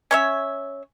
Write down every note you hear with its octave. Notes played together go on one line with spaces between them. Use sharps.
C#4 C#5 E5